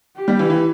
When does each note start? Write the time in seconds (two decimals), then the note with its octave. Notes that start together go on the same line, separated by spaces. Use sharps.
0.16 G4
0.28 G3
0.39 E3
0.50 E3